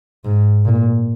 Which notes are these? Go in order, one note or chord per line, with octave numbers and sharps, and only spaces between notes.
G#2
A#2